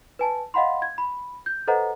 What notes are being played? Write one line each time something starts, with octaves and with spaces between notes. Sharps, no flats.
B4 G#5 A5
D#5 F5 F#5 B5 C6
G#6
B5
G6
A4 B4 C5 D#5 F#5 A#5